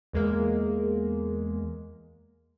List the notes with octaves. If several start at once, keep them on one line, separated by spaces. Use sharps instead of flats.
E2 G#3 A#3